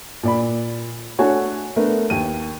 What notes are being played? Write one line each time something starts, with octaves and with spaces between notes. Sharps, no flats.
A#2 D5 B5
A3 D4 F#4 A4 C#5 G#5
A3 B3 D4 A#4
D#2 D#7